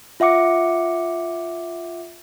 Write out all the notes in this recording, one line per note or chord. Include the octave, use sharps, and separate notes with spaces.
F4 E5 F#5 D6 C#7